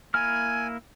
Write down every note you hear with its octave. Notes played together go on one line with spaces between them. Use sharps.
A#3 E4 G#5 F6